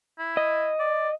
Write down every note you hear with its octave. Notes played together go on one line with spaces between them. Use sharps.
E4
D#5
D5